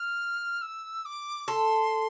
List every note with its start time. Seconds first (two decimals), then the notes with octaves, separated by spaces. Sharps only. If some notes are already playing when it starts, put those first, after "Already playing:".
Already playing: F6
0.62 E6
1.05 D6
1.48 A4 C6